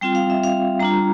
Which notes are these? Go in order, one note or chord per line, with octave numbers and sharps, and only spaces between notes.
G3 C4 F4 G5
F5
E5
F5
G3 D4 F4 A#5